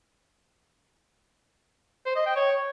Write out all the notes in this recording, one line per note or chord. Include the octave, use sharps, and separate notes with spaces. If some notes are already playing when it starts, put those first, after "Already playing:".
C5
D#5
G5
C#5